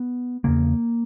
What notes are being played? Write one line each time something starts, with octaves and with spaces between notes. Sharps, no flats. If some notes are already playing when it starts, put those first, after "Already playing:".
Already playing: B3
E2 C#3 A#3